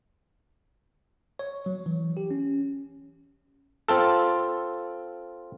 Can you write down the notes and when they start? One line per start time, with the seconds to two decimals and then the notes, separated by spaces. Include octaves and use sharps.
1.39 C#5
1.66 F#3
1.86 E3
2.17 G4
2.31 C#4
3.89 C4 F4 A4